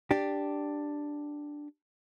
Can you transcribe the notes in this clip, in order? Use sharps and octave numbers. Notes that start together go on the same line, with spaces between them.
D4 G4